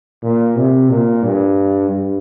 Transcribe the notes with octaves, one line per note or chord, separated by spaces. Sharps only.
A#2
C3
A#2
G2
G2